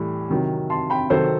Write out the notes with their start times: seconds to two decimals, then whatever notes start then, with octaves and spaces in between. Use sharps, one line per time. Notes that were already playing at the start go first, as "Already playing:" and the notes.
Already playing: A2 E3 G3
0.30 C3 D#3 F#3
0.70 A5 C6
0.90 G5 B5
1.10 C3 D#3 F#3 A4 C5